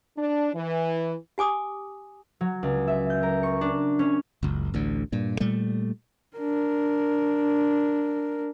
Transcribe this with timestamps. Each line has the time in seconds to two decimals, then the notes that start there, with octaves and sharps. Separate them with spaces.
0.17 D4
0.54 E3
1.38 G4 G#5 D6 D#6
2.41 F#3
2.63 C#2
2.88 E5
3.10 G6
3.23 A#4
3.43 C#6
3.61 D4
3.99 C#4
4.43 F#1 C#2
4.74 A1 D2 D3
5.12 G2 A#2
5.40 A#2 G3 A3
6.37 D4 A#4